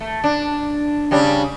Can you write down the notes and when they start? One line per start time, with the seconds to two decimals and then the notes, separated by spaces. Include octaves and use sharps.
0.01 A3
0.24 D4
1.11 C#3 G3 D4